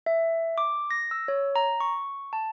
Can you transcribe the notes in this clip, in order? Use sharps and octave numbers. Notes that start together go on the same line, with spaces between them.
E5
D6
A#6
E6
C#5
A#5
C#6
A5